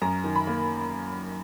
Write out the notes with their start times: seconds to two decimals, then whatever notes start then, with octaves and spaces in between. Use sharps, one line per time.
0.02 F#2 A#5
0.24 D#3
0.36 B5
0.47 A#3